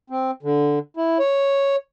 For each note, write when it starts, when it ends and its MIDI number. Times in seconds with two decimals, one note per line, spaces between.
0.10 0.31 60
0.43 0.79 50
0.97 1.18 64
1.19 1.76 73